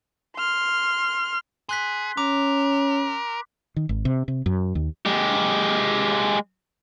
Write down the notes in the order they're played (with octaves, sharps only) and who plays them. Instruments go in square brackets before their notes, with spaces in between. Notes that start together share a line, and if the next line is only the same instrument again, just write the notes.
[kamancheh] C6 F6
[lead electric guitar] G#4 [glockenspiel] C6 F#6 B6
[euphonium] C#4 [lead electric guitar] A#4 [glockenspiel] D6
[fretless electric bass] D#3
G#1
C3
C3
F#2
D#2
[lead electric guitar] G#3 G4